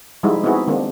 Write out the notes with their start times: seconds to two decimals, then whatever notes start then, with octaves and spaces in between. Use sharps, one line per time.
0.23 F3 G3 G#3 D#4 E4
0.44 B3 C4 D#4 E4 F#4 G#4
0.67 D#3 G#3 A#3 C4 D4